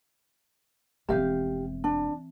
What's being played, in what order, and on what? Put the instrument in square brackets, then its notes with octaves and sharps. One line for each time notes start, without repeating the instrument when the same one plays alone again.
[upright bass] E1 F2 [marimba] E3 C4 G6 [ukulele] G4 F5
[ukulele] D4